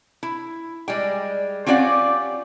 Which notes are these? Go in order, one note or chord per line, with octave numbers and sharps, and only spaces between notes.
E4
G3 G#3 G5
C4 C#4 F4 G4 D5 F#5